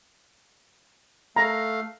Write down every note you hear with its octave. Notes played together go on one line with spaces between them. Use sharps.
A3 F5 A#5